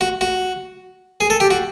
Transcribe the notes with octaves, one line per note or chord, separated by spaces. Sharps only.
F#4
F#4
G#4
A4
G4
F#4